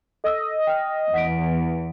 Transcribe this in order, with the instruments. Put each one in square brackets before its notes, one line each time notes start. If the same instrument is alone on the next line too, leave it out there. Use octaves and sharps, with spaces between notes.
[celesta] A4 E6 [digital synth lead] D#5
[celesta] G5 F6
[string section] E2 [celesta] F#5 B6 D7